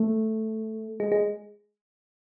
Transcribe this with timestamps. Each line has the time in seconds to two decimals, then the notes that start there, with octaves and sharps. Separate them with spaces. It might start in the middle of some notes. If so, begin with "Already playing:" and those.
Already playing: A3
1.00 G#3
1.12 G#3